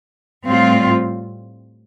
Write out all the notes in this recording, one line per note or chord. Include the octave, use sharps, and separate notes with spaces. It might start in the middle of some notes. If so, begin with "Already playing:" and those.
A2 G3 C4 F4